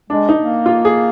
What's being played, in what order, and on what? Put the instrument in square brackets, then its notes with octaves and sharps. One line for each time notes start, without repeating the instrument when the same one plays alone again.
[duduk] G#3 [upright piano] D4
[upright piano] D#4
[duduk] A#3
[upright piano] F4
G#4